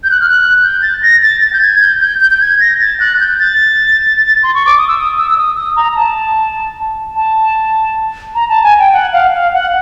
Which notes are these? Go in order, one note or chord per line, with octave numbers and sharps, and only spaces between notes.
G6
F#6
F6
F#6
G6
A6
A#6
A6
A6
G6
G#6
G6
G6
G6
G6
G#6
A#6
A6
F#6
G6
A6
C6
C#6
D6
D#6
E6
D#6
E6
E6
D#6
D#6
A#5
A#5
A5
A5
A#5
A5
G#5
G5
F#5
F5
F5
F#5